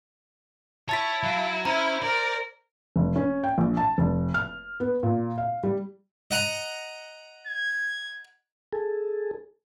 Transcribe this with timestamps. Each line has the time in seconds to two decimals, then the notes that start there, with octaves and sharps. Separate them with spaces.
0.89 E4 C#5 A5 A6 B6
1.23 F#3 F#4 F5
1.65 C#4 E4 C5 A#5
2.03 A#4 D5
2.96 F1
3.16 C#4
3.44 G5
3.58 A#1
3.77 A5
3.98 F1
4.34 F6
4.80 B3
5.03 A#2
5.38 F5
5.63 G3
6.31 D#5 F#5 A#5
7.47 G#6
8.73 G#4 A4